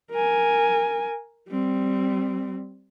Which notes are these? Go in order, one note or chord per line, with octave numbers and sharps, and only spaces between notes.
A#4 G#5
G3 C4